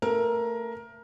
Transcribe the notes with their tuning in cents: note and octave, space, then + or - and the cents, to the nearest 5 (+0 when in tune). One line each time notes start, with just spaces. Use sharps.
A3 +30 A#4 +15